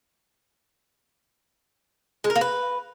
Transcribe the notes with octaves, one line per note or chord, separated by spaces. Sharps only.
G#3
A#4
A#3
B4